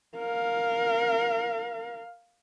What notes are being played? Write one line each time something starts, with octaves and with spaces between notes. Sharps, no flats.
A#4 F5